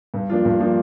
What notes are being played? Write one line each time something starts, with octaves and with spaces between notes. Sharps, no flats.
G2
F3 A#3 D4 F4
G2
F3 A#3 D4 F4